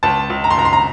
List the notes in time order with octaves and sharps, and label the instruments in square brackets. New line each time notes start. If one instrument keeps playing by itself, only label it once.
[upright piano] C#2 A5
C#2
A#5
C6
C#2 A#5
C6
A#5